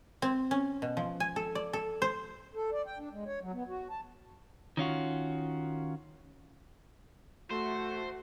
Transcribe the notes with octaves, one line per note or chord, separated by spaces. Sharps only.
C4
C#4
B2
F3
G#5
A4
D5
A4
C5
A4
D5
G5
D4
G#3
C#5
F#3
B3
F#4
A5
D#3 C#4 F4 F#4
A3 F#4 C5